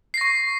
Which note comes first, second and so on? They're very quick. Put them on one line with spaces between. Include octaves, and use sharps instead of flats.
C7 A#6 C#6